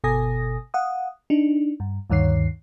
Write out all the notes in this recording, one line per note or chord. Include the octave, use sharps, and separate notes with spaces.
G1 B2 A4 G#5 D#6 A#6
F5 F#5 D#6
D4 D#4
G2
D2 G2 D#3 C#5 C7